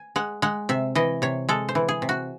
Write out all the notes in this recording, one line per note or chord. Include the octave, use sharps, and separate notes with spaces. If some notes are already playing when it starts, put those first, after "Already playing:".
Already playing: G#5
G#3 F#5
G#3 F#5
C3 E5
E3 D#5
C3 C#5
G#3 A4
C5
E3
G#4
C3
F#4